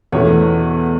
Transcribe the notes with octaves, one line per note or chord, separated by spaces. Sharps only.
E2 B2 A3 C#5